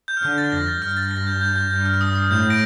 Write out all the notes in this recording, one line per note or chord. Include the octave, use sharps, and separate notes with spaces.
G6
F6
D3 G6
A6
F2 A#6
A6
G2 F6
A6
A#6
G6
G6
G6
G2 G6
F6
D#6
D#6
A2 G6
A#6 D7